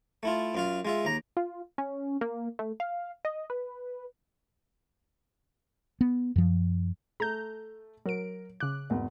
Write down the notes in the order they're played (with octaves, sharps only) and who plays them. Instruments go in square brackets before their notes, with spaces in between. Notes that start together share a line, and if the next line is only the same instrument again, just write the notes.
[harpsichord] A3 E4 F4
F#2 F4 F5
G#3 F4 E5
D#2 A#5
[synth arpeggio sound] F4
C#4
A#3
A3
F5
D#5
B4
[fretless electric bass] B3
F#2 F3
[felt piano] A3 [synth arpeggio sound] A#5 G6
[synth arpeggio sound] F#3 D7 [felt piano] A#4
[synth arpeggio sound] C#3 F#6 [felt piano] D6
[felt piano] G#1 E2